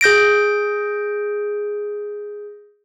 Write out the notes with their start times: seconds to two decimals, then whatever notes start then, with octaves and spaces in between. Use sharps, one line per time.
0.01 G#4 G6 A#6 D7